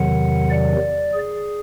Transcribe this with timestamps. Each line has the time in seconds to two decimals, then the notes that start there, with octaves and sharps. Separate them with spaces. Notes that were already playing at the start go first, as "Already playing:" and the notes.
Already playing: E2 C3 D#3 F#3 F#5
0.50 D5
1.14 G#4